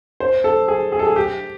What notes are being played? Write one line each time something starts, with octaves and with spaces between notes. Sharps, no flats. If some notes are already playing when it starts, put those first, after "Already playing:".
C5
A4
G#4
G#4
A4
G#4
G4